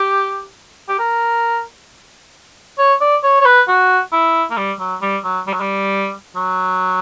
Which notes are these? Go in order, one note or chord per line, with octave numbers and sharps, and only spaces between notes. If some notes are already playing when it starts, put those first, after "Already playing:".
Already playing: G4
G4
A#4
C#5
D5
C#5
C#5
B4
F#4
E4
A#3
G3
F#3
G3
F#3
G3
F#3
G3
F#3